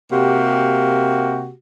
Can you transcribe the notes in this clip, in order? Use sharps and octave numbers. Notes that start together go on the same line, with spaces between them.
C3 A#3 F#4 G4